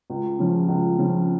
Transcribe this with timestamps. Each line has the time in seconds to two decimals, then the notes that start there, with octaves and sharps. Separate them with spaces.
0.10 C#2
0.39 C#3 F3
0.68 C#2
0.98 C#3 F3